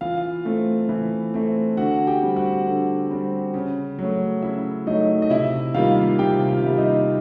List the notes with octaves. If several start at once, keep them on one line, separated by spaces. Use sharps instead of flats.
E3 F4 F5
A3 C4
E3
A3 C4
D3 F#4 F#5
G4 G5
G3 C4
F#4 F#5
D3
G3 C4
C#3
F#3 A3
C#3 E4 E5
F#3 A3 D#4 D#5
D#5
C3 E4 E5
D#3 G3 A#3 F4 F5
C3 G4 G5
F4 F5
D#3 G3 A#3 E5
D#4 D#5